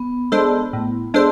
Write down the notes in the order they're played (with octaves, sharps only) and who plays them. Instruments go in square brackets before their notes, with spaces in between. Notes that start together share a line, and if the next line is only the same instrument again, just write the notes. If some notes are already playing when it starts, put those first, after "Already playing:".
Already playing: [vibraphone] B3
[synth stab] G#3 D4 A4 C5
A2
G#3 D4 A4 C5